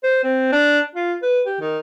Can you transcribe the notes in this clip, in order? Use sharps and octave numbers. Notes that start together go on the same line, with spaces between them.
C5
C4
D4
F4
B4
G4
D#3